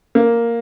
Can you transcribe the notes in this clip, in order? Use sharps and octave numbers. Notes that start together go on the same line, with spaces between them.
A#3